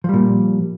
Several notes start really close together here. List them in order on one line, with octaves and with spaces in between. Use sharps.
F3 G3 A#2